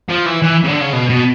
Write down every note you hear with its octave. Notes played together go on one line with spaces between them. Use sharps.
F3
E3
E3
C#3
D3
C#3
B2
B2